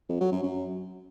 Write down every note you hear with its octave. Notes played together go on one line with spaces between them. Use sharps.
F2
F#3
F#2
F#2